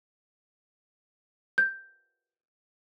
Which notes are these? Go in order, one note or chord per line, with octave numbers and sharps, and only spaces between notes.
G6